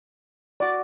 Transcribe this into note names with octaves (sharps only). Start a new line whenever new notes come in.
F#4 D5 D6